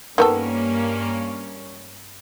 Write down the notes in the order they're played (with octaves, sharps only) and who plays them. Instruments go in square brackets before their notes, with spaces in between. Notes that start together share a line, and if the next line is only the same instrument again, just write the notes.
[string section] G2 A#3 C#4 [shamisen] D#3 B3 A4